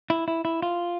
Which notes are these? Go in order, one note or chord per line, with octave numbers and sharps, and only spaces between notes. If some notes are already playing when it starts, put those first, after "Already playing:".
E4
E4
E4
F4